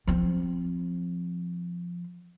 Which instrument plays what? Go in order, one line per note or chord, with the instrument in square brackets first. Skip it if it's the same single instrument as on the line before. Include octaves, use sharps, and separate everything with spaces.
[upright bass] F3 C4